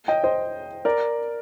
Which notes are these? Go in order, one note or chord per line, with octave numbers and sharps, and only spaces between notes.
D#5 G5
C5 D#5
A#4 D5